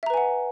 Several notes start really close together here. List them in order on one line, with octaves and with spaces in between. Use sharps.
E5 A#5 B4 G#5 F#5